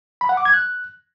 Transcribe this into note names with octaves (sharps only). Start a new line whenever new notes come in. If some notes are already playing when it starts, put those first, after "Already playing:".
B5
F#5
D6
G#6
F#6